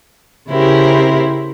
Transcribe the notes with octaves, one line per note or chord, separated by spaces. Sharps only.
C#3 E4 G4 A#4 C5